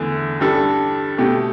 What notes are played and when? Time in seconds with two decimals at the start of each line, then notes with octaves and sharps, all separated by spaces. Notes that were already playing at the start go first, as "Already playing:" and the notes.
Already playing: E2 D3 A3
0.40 G2 G3 D4 A4
1.18 B2 A3 G4